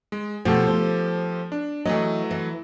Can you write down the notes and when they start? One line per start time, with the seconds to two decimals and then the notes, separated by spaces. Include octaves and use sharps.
0.12 G#3
0.45 B2 F3 A3 G4 A4 F#5
0.67 C5
1.52 D4
1.85 E3 F#3 A3 B4 D#5
2.31 E3